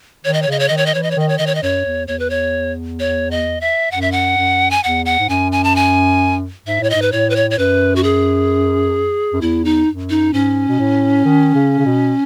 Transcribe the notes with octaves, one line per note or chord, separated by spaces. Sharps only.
D#3 C#5
D#5
C#5
C#3 D#5
C#5
D#3 D#5
C#5
D#5
E3 C#5
D#5
C#5
D#3 D#5
C#5
D#3 D#5
C#5
D#5
F#2 C#5
E2
E2 C#5
B4
C#5
C#5
D#5
E5
F#2 F#5
E5
F#5
F#2
G#5
E2 F#5
F#5
G#2
F#2 G#5
G#5
A5
G#5
G#2 E5
A2 C#5
G#2 D#5
B4
A2 C#5
B4
C#5
C#5
F#2 B4
F#4
G#4
F#2
E2 E4
D#4
F#2
D#4
G#2 C#4
B2
A2
D#3
C#3
C#3
B2